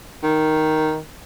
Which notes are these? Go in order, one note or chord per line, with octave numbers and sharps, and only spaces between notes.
D#3